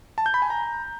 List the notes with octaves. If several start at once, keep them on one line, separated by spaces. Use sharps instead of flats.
A5
G6
B5
G#5
A#5